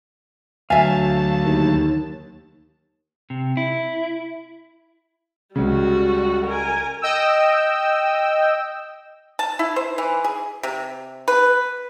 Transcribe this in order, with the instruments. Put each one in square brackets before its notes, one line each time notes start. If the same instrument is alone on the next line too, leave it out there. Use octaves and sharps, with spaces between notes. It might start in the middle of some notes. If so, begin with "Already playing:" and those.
[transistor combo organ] D2 A5 [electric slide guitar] F#3 F5 [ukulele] E5 G#5
[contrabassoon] D#2
[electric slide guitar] C3
E4
[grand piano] C#2 C#3 [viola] G3 F#4
[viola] A#4 G#5
[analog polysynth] D#5 G5 E6
[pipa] A5
E4
C5
E3
G#4
C3
B4